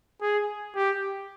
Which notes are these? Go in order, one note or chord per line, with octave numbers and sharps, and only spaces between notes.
G#4
G4